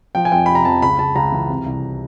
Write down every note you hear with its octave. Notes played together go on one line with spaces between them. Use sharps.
F3 G5
G#5
F2 G5
C3 B5
A#5
F2 A5
C#2 B5
C#2 A5
C#2 A#5
E3
C3
C2